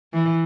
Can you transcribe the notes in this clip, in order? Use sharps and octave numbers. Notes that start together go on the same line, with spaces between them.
E3